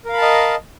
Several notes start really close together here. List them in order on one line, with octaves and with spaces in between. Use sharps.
A#4 F5 B5 A5 D#5